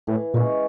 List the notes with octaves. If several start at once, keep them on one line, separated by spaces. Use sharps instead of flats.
A2 E3
A#2 G#3 C#4